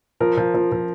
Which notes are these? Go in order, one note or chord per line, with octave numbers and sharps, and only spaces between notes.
F3 A#4
F3
F3
F3